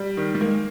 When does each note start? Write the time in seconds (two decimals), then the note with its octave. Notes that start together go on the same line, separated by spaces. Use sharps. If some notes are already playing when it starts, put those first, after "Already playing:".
Already playing: G3
0.17 D#3
0.35 G3
0.40 G#3 A#3